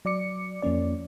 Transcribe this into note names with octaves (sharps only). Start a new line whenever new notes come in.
F#3 D5 D6 C#7
F2 F3 A#3 C#4 D5